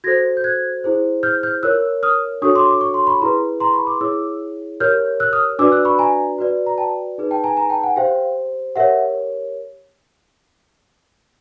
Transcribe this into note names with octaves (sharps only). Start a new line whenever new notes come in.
F#4 A4 C5 G#6 A#6
G6
F#6 G#6
E4 G#4 C5
F6 G6
F6 G6
F4 A#4 C#5 E6 F#6
D#6 F6
D4 F#4 A4 C#5 C#6 D#6
C6 D6
D6
C#6
C6
B5 C#6
E4 G#4 B4 A#5 C6
A#5 C6
B5 C#6
C6 D6
E4 G#4 C#5 D6 E6
G4 A#4 C#5 F6 G6
E6 F#6
D#6 F6
D4 F#4 B4 D5 D6 E6
E6 F#6
B5 C#6
G#5 A#5
F#4 B4 D5
A#5
G5 A5
D#4 G#4 B4
G5 A5
G#5 A#5
G#5 A#5
G5 A5
F#5 G#5
G4 C5 F5 G5
G4 A#4 C#5 E5 F#5